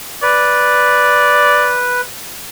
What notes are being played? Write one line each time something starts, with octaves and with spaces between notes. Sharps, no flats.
B4 D5